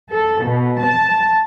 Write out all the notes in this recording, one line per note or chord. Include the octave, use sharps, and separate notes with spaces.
A4
B2
A5